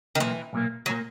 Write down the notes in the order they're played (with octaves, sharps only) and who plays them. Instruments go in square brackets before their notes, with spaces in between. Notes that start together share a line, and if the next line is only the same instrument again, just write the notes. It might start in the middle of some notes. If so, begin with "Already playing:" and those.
[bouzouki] D#3
[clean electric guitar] B1 A#2 A#3 [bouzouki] E3
[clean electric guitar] B1 A#2 A#3
[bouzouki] F#3
[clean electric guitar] A#2 A#3